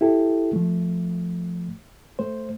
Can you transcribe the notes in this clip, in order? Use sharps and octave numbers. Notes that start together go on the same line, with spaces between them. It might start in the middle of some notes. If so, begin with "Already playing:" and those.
E4 G4 A4
F3 A3
A3 C5